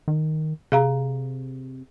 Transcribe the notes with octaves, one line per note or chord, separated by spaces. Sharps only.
D#3
C3 G#4 F5 A#5